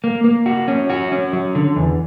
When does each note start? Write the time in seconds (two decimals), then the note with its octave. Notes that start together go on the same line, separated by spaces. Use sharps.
0.04 A#3
0.24 A#3
0.46 F#4
0.68 C#4
0.90 F#4
1.12 C#4
1.33 F#3
1.55 D3
1.76 E2